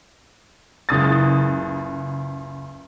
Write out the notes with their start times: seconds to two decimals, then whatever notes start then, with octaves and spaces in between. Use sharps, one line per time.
0.89 F#1 C#2 D#6 A6